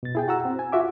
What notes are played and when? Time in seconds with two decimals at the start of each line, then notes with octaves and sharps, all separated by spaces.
0.03 B2 A6
0.15 E4 G#4 G5
0.28 F#4 F#5 A#5 E6
0.45 C4
0.59 G#5
0.72 F4 F#4 E5 D6